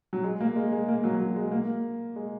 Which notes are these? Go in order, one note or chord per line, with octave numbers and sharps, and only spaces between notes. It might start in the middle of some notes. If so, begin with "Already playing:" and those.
F#3
G#3
A#3
G#3
G#3
A#3
F#3
F#3
G#3
A#3
G#3